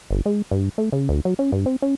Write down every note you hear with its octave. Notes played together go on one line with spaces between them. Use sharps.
G1
G#3
G2
A3
C#3
D2
F#3
C#4
G2
C4
C#4